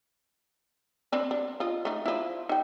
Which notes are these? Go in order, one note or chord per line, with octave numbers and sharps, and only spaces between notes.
C4 D4 B4
D4
F4 D#5
A3 D#4
F3 E4
D#4 G5